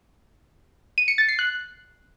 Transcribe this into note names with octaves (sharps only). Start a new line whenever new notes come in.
D#7
C#7
A6
C7
F#6